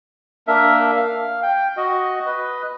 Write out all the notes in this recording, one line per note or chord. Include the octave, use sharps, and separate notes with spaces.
A#3 D4 A#4 E5
F5
G5
F#4 D#5
B4 D#5